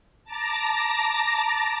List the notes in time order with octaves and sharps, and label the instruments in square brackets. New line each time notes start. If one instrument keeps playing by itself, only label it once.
[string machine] A5 A#5 D6 A#6